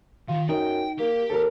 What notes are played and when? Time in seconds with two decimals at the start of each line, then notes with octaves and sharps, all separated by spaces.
0.28 D#3 F4
0.49 F#2 D#4 G5
0.99 A#3 G4
1.30 D#2 A4 A#4